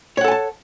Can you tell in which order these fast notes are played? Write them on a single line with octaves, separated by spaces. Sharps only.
C#5 F#5 A4 G#5 A5